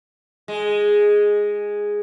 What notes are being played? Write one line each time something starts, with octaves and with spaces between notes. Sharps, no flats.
G#3